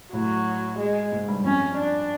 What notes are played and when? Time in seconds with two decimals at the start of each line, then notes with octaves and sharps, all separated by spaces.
0.13 A2 F#3
0.79 G#3
1.12 G#2
1.28 G2
1.45 F2 C#4
1.78 D4